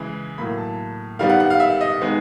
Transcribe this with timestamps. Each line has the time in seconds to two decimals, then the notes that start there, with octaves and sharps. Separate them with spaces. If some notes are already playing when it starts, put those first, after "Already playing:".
Already playing: C#3 E3 G#3
0.38 A2 F#3 A#3 B5
0.58 A5
1.19 D#3 G3 B3 F5
1.30 F#5
1.40 F#5
1.50 F5
1.60 E5
1.81 D#5
2.01 D#3 G#3 B3